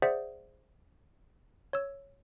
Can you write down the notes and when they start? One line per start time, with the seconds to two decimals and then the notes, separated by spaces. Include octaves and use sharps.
0.02 G#4 C5 D5 E5 F#5
1.73 C#5 E6